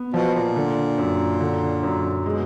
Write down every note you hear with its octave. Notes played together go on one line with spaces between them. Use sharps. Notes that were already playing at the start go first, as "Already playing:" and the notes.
Already playing: B3
B2 F3
A#2
D3
F#2
D3
F#2
B2 G#3